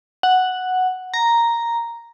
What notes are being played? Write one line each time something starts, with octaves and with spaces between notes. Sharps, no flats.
F#5
A#5